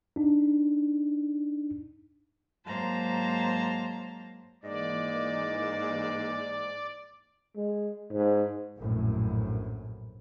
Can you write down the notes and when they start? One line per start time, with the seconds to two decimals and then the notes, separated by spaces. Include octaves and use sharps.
0.16 D4 D#4
2.66 G#2 F#3 A#3 C5 A5 A#5
4.63 G#2 E3 A#3 D5 D#5
7.57 G#3
8.12 G#2
8.79 A#1 F#2 A2